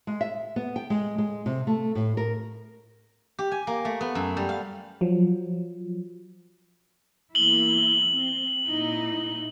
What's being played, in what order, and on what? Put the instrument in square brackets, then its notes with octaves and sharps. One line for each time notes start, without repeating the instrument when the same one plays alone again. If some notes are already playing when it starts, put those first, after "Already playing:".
[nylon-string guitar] G#3
E5
B3
G5
G#3
G#3
C3
A3
A2
A#4
[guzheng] G4
G#5
A#3
A3
B3
F#2
G3
F5
[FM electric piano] F3 F#3
[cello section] E2 A#3 E4 [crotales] F#7 G7
[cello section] C4
A#2 D#4 E4